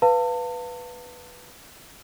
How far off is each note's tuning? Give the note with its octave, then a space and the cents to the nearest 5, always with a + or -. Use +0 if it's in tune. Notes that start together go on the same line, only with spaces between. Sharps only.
B4 +0 F5 +0 A5 +40